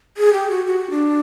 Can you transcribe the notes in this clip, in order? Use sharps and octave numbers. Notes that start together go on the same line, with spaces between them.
G#4
G4
F#4
F#4
D4